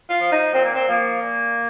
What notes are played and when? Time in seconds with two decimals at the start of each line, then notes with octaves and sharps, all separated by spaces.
0.10 F4
0.20 F3
0.32 D#4
0.54 A#2 C4
0.63 A#3
0.74 C4
0.88 F3 A#3
1.21 A#2